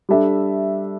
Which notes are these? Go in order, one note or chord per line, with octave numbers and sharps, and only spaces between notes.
G3 D4 A4 E5